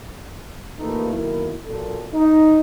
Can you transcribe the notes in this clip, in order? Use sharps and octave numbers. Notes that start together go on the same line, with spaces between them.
A1 A#2 A3 A#3 D#4 B4
B1 D#3 A#3 E4
B1 A#2 A4
D#4